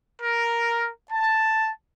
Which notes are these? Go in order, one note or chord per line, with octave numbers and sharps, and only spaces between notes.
A#4
A5